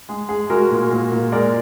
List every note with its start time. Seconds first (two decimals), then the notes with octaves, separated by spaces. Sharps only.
0.09 G#3 G#4
0.29 G#3 G#4
0.50 G#3 F#4 A#4
0.71 A#2
0.91 A#2
1.12 A#2
1.32 G#3 A#4 D5